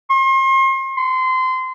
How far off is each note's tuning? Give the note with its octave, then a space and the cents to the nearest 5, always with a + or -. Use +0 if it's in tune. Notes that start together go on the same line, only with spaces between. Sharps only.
C6 +40
C6 -25